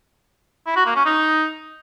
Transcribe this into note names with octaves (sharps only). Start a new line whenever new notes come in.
E4
F#4
A#3
C#4
D#4